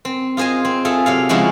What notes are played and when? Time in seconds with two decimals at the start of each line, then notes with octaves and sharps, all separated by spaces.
0.05 C4
0.37 F4 G#4 C5 D#5 G#5
0.65 C4
0.85 F4 G#4 A4 E5
1.06 C3 F#3 F5
1.29 C#3 F3 G#3 E4 F#4